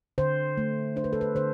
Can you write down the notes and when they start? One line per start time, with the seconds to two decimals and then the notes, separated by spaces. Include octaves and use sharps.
0.18 D3 C5
0.57 A3
0.96 D4 C5
1.04 B4
1.13 A4
1.21 B4
1.35 D3 C5